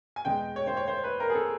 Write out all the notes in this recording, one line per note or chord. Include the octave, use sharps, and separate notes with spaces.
G#5
E2 B2 G#3 G5
C#5
C5
C#5
C5
B4
A#4
G#4
A4